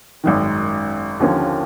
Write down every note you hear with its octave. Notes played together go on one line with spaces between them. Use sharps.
G#1 F#2 D#3
D#2 D3 F3 A#3 C#4